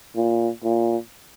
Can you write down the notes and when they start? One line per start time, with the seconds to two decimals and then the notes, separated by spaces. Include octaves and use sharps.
0.15 A#2
0.63 A#2